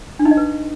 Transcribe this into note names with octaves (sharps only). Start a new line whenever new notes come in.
D4
D#4
D#5
B4